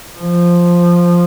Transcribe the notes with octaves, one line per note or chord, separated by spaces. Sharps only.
F3